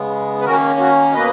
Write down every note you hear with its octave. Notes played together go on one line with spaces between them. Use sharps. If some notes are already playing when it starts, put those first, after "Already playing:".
Already playing: C#3 G#3 B3
B4
D#3 A#3 C#4 F#4 A#4
F#4
B2 A#3 B4 D#5